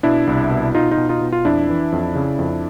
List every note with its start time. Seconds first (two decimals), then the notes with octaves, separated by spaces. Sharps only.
0.03 B2 D4 E4
0.27 C2
0.51 B2
0.75 B2 D#4 F4
0.91 D#4 F4
0.97 B2
1.09 D#4 F4
1.21 B2
1.32 F4
1.45 F2 D4 E4
1.69 E3
1.92 F2
2.15 C#3
2.39 F2